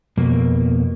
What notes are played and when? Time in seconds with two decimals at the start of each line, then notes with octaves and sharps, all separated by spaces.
0.17 F2 B2 A#3